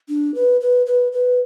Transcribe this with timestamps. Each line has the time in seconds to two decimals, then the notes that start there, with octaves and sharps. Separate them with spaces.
0.09 D4
0.35 B4
0.61 B4
0.86 B4
1.12 B4